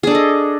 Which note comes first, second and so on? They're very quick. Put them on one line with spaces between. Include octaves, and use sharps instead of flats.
G#4 D4 A4 D#5